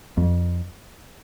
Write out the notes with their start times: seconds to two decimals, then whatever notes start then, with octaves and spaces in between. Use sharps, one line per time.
0.17 F2